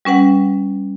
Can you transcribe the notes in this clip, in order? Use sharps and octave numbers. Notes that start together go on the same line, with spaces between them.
G3 C#4 B4 F#5